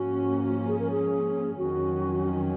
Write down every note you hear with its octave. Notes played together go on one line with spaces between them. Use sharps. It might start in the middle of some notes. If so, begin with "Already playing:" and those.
Already playing: G#2 F3 A#3 C#4 F#4
G#4
A#4
G#4
F2 D#3 F#3 C#4 F#4